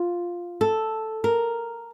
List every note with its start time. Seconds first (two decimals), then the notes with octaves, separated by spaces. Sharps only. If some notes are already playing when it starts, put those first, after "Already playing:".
Already playing: F4
0.61 A4
1.24 A#4